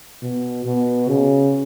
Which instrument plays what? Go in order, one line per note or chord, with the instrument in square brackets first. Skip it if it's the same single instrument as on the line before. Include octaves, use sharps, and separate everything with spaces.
[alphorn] B2
B2
C#3